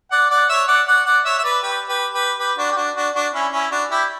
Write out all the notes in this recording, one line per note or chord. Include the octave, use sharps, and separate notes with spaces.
D5 F#5
D5 F#5
C#5 E5
D5 F#5
D5 F#5
D5 F#5
C#5 E5
E5
B4 D5
G4 B4
G4 B4
G4 B4
G4 B4
D4 F#4
G4
D4 F#4
D4 F#4
D4 F#4
C#4 E4
C#4 E4
D4 F#4
E4 G4